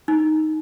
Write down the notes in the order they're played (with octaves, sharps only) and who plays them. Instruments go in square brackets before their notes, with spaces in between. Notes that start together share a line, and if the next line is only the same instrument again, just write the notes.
[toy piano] D#4